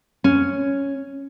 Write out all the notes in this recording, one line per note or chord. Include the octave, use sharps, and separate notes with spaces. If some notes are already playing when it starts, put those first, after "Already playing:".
C#4